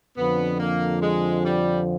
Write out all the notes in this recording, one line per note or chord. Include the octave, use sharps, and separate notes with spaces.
F2 D3 F3 B3
A#3
G#3
G3